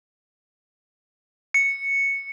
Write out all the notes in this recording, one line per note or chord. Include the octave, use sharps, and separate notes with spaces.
C#7